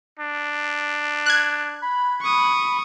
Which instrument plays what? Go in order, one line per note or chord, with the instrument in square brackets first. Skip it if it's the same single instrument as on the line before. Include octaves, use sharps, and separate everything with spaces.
[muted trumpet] D4
[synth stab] F#6 G#6
[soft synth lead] B5
[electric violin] C#6 D#6